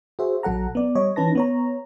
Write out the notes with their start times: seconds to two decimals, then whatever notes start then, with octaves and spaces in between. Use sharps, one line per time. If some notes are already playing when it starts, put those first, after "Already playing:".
0.19 F#4 G#4 C5 E5
0.43 A#1 F#3 A4 F#5 A#5
0.75 B3 D5
0.95 G3 C#5 D#5
1.16 E3 C#4 D#4 B4 A5 A#6
1.35 B3 C#5 A#5